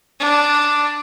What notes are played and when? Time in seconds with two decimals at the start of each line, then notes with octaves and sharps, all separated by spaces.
0.20 D4